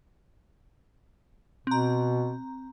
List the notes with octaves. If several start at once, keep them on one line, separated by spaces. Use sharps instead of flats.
B2 C4 A#5